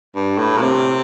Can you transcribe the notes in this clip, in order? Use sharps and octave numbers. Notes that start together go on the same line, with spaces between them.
G2
A2
A#2
C3